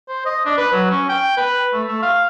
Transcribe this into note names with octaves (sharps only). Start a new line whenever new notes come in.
C5
D#5
D4
B4
F#3
C#4
G5
B4
A3
A3
F5